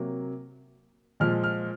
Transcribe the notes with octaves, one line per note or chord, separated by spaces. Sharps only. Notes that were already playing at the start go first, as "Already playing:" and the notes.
Already playing: C3 F#3 A#3
A#2 F3 G#3 F6
F6